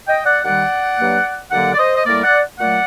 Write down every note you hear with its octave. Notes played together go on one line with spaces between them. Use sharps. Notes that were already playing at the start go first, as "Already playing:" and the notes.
D#5 G5
D5 F#5
D#2 D#3 G3 D5 F#5
G2 F#3 A#3
D#2 D3 F#3 A#3 D5 F#5
D5
C5 D#5
D#5
A2 G3 A#3 A#4 D5
D5 F#5
A#2 F#3 A3 D5 F#5